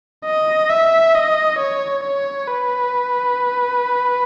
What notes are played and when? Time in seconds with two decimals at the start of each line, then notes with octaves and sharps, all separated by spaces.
0.25 D#5
0.70 E5
1.15 D#5
1.58 C#5
2.03 C#5
2.48 B4